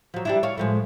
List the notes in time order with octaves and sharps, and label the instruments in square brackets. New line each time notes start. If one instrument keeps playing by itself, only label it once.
[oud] F3 F#3
G3 D4 E4
C#5 F5
A2 F3 G#3